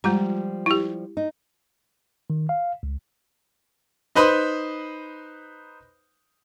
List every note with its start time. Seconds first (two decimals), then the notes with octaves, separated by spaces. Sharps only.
0.04 F3 G3 G#3 F4 A#5
0.66 E4 G4
1.17 D#4
2.30 D#3
2.49 F5
2.83 C#2
4.15 D#4 B4 C5 B5 D#6